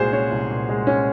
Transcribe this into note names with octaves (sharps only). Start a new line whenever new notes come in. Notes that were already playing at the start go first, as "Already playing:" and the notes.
Already playing: C2 A#2 G#3 F#4 G#4 C5
C#4 C#5
C2
A#2
G#3
C#4